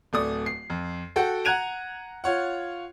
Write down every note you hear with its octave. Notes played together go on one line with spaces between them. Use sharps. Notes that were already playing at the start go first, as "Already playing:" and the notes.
D1 A3 D5 D#6
C7
F2
F#4 A4 F#5 G5
F#5 A#5 F#6 G#6 D#7 F7
F4 C#5 F#5